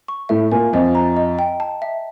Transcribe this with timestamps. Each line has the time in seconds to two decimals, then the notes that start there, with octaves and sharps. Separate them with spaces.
0.08 C#6
0.29 A2 A3 E5
0.52 A#2 A#3 G#5
0.73 F2 F3 D#5
0.95 A#5
1.17 D#5
1.39 G5
1.60 A5
1.82 E5